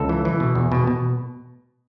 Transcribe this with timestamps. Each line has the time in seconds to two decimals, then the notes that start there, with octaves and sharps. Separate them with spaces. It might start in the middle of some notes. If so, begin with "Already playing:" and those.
Already playing: C#2 A4
0.09 E3
0.25 E3
0.40 B2
0.55 E2
0.72 B2
0.87 B2